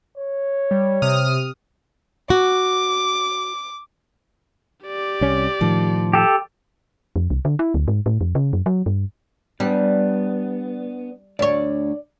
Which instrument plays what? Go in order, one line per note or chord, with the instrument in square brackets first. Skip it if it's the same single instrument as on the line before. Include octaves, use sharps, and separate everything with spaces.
[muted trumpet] C#5
[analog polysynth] G3
C3 D#6 F6
[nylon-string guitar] F#4 [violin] D6
[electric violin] G4 D5
[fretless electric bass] C2 C#4
[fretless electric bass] A2 D#3 [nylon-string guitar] F3
[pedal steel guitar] G4 A4
[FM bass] F2
C2
D3
E4
D2
G#2
A2
F2
C#3
F#2
F#3
G2
[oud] G3 [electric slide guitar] B3 D4
[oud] D2 C#5 [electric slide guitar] D5